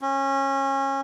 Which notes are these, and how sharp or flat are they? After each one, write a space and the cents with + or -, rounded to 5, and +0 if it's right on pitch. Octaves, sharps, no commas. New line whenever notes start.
C#4 -25